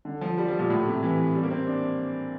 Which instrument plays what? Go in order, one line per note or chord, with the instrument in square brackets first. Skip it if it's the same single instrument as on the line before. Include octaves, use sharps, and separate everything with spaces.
[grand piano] D3
F3
G3
F3
A#2
A2
C3
E3
G3
A#3
C4
D4